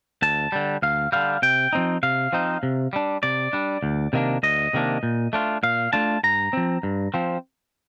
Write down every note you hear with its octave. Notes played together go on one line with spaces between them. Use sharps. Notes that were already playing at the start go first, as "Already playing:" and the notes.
D2 A5
D3 G3
D2 F5
D3 G3 F5
C3 G5
F3 C4 D#4
C3 F5
F3 C4 D#4
C3
G3 D4
C3 D5
G3 D4
D2
C3 D#3 A#3 D4
D2 D#5
C3 D#3 A#3 D4
A#2
A3 D4 F4
A#2 F5
A3 D4 F4 A5
G2 A#5
F3 C4
G2
F3 C4